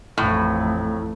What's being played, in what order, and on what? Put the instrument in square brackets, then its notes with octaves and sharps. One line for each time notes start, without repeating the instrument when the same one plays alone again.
[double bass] A1 F2 [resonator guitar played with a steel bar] A2